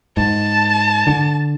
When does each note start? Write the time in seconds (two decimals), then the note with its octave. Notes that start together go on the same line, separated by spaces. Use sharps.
0.17 G#2 A5
1.07 D3